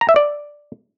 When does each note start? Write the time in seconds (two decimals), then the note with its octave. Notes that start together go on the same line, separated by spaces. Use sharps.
0.01 A#5
0.09 E5
0.16 D5